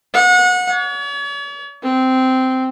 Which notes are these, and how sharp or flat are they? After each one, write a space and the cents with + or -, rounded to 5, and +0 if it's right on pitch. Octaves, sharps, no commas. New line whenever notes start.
F#5 -30
C#5 +45
C4 -10